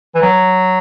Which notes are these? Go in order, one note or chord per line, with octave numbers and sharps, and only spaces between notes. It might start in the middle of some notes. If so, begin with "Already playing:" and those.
E3
F#3